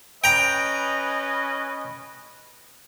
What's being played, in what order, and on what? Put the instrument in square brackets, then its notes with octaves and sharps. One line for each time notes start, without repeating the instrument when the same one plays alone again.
[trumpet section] C#4 B4 D#5 [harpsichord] G5 A#5